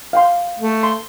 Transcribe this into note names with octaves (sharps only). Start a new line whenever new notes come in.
F5 G5 C6
A3
C6